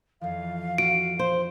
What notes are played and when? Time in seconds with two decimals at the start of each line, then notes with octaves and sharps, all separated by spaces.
0.21 F2 E3 F3 F5
0.78 F#4 D7
1.19 C5